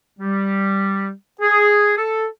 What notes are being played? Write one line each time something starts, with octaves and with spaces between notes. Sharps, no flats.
G3
G#4
A4